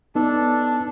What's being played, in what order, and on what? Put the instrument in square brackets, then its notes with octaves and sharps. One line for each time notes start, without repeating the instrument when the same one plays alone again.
[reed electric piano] B3 D#4 [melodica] D4 A4